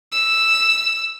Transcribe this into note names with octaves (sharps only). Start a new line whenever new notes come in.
E6